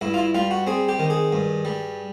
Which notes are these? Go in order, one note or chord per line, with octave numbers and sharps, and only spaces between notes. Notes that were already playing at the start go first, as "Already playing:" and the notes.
G2 E4
F4
E4
G3 F4
F#4
C4 G#4
G4
D#3
G#4
G2
G3